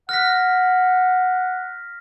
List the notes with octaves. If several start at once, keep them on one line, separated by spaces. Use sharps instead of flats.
F#5 F6 A#6 B6